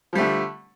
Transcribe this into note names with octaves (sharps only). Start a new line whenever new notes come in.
D3 F3 G3 A3